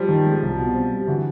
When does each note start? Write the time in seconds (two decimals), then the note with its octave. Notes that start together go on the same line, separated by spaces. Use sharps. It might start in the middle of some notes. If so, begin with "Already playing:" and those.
Already playing: F3 G3
0.09 D#3
0.26 G#3
0.42 C2
0.58 B2
0.74 C4
0.91 G3
1.07 D3 E3 F#3